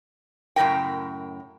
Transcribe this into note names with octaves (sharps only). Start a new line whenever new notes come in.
F#2 A2 C#3 A#4 G5